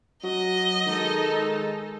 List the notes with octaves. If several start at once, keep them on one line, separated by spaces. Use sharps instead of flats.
F#3 D#5
D#3 G#3 D#4 A4